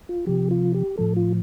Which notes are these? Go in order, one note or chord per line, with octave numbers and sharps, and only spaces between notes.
F4
C3 F3 G4
F4
G4
A2 F3 A4
F4